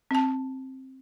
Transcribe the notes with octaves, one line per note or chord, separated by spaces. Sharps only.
C4 A5